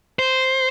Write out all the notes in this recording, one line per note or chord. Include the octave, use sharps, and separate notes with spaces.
C5